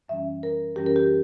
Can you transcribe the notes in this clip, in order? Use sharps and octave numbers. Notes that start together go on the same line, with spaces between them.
F#2 E3 G3 C#4 E5
A#4
F#2 E3 G3 C#4 G4
A#4
G4